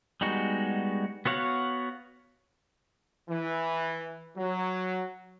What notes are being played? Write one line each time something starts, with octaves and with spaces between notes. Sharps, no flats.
G3 G#3 B3 D#4 F#4
B3 F#4 C#5 F5 F#5
E3
F#3